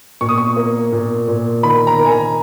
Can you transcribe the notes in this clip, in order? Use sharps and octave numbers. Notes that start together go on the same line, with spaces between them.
A#2 C#6
D#6
C#6
A#3
A#2
A#2
D#3 B5
A#5
D#3
G#5
A#5